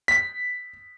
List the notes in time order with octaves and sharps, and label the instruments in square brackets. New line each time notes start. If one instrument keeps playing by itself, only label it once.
[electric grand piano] B6